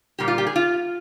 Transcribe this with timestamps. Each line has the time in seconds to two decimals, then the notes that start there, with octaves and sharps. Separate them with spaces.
0.19 A#2 G3 A#3 G4
0.28 F4
0.38 G4
0.47 G#4
0.56 F4